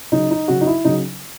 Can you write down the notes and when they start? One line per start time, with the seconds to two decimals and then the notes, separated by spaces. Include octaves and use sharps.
0.12 C#3 F#3 D#4
0.31 D#4
0.48 C#3 F#3 F#4
0.61 D#4
0.67 E4
0.85 C#3 F#3 D#4